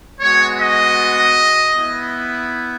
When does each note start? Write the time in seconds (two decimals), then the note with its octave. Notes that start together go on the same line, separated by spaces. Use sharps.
0.20 G#3 B3 F#4 C#5
0.59 D#5
1.75 B3 E4